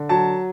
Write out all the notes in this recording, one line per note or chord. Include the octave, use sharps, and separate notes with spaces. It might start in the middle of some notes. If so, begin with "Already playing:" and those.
Already playing: D3
F#3 A5